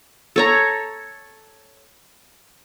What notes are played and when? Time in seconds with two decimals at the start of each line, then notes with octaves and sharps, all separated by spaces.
0.36 A4 C#5 A#5